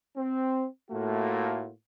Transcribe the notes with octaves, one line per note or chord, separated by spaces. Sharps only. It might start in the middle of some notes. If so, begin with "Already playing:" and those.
C4
A2 A3 A#3 F4 F#4